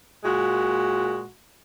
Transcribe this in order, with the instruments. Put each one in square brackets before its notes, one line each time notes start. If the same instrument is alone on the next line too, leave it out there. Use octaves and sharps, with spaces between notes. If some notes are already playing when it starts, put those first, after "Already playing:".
[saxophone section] A#2 G#3 F#4